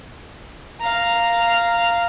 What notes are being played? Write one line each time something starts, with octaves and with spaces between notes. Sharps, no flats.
F5 A#5